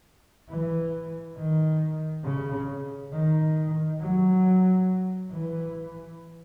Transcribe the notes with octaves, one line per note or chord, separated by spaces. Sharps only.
E3
D#3
C#3
D#3
F#3
E3